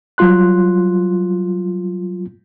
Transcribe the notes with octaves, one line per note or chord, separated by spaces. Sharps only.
F#3 G3 F4 C6 F#6